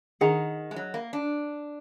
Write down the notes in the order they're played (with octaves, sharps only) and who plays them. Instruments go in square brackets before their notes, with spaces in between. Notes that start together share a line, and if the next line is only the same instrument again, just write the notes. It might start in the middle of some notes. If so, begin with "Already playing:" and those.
[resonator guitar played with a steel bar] D#3 [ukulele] G#4 D#5 F#5 A#5
[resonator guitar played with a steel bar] G#3
F#3
A#3
D4